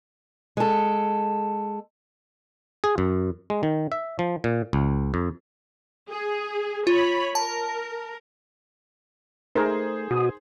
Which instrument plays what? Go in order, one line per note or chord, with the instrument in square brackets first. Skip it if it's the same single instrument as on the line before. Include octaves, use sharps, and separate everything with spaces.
[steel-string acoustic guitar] G#3 A4
[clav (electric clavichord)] G#4
F#2
G#3
D#3
E5
F3
A#2
C#2
F2
[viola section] G#4
[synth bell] F4 [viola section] C#5 B5
[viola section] A#4 [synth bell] A5
[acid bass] A3 [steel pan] D#4 A#4 [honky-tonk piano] G#4 C5
[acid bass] B2 [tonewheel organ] F#4 D#6